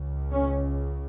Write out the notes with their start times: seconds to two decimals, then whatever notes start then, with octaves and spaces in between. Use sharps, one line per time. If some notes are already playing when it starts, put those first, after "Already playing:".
Already playing: C#2 C#3
0.32 C#4